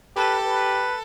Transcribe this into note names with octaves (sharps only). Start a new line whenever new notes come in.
G4 A4 B4
B4